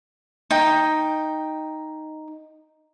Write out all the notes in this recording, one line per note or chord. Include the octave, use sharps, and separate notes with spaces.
D#4 G5